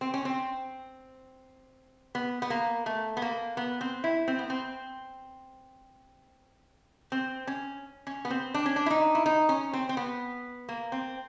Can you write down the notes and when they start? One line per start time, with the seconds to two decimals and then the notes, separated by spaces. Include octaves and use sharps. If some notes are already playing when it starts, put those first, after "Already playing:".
0.01 C4
0.14 C#4
0.25 C4
2.15 B3
2.42 B3
2.50 A#3
2.86 A3
3.17 B3
3.22 A#3
3.57 B3
3.81 C4
4.04 E4
4.28 C4
4.39 B3
4.50 C4
7.12 C4
7.47 C#4
8.07 C#4
8.25 B3
8.31 C4
8.54 D4
8.66 C#4
8.76 D4
8.86 E4
8.90 D#4
9.15 E4
9.26 D#4
9.49 C#4
9.73 C4
9.89 C4
9.97 B3
10.69 A#3
10.92 C4